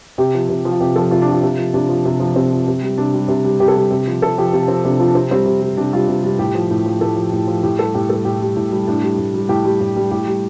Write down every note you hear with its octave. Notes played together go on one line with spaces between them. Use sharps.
C3 G4
F3
C3
F3
F4
C3 G4
F3 A4
C3 F4
D4
F3
F4
C3
F3
C3 D4
F3
C3
F3
C3 C4
F3
C3
G3
C3 D4
G3
C3
G3
C3 G4
A4
G3 G4
C3
F3
C3 A4
F3 G4
C3 F4
F3 C4
C3 D4
F3 F4
C3 C4
G3 C4
C3
G3
C3 D4
G3 F4
C3
G3
A2 G4
F3
A2
F3
A2 A4
F3
A2
F3
A2 G4
G3 A4
A2 G4
G3 A4
A2 G4
G3
A2
G3
A2 D4
G3
A2
G3
A2 G4
G3
A2
G3
A2 G4
G3